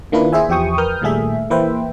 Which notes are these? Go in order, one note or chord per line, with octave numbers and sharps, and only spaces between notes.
D#3 A#3 D4 E4 F4 B4
E4 G#4 C5 E5 G#5
E2 F3 G4 G5 C#6 D#6
A#4 B4 D#6 F6 G6
A#2 D#3 G3 A3 G#4 E5
E3 A#3 B4 C5 E5 G5